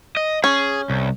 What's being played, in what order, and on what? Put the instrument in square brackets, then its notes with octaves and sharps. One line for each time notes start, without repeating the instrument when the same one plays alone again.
[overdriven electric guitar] D#5
[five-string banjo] C#4 [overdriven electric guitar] G#4
[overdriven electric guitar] C2